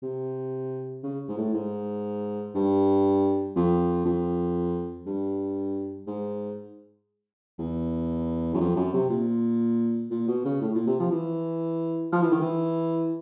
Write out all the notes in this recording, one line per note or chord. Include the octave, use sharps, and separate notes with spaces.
C3
C#3
G#2
A2
G#2
G2
F2
F2
G2
G#2
E2
F#2
F2
F#2
C3
A#2
A#2
B2
C#3
A2
A#2
C3
F3
E3
F3
E3
D#3
E3